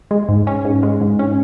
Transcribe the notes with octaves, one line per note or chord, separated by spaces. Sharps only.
G#3
G#2
C#4
G#2
G#3
G#2
C#4